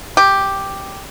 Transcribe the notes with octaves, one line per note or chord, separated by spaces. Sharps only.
G4